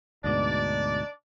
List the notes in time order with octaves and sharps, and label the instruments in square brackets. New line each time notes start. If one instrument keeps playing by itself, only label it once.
[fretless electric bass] D2 G#2 B2 [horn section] D4 D#4 D5